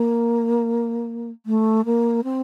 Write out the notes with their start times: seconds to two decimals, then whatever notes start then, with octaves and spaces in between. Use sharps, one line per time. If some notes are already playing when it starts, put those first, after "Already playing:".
Already playing: A#3
1.46 A3
1.85 A#3
2.24 C4